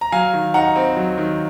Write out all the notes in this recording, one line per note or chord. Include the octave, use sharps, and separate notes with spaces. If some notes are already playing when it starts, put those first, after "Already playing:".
A#5
F#3 F5 G#5
D#3
D#4 F#5 A#5
C4
F#3
D#3